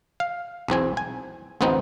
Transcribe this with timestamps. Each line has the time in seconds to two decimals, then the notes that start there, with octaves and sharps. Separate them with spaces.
0.20 F5
0.68 B1 E2 C4 G#5
0.97 G#5
1.61 A1 D2 B3 C4 D#4